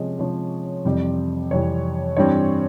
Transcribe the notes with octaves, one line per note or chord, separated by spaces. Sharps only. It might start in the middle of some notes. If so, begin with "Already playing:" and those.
Already playing: C3 F3 G#3 C#4 D#5
C3 F3 G#3 C#4 C#5
F2 C3 E3 G3
F2 C3 E3 G3 C#5
G2 E3 G3 C4 C#5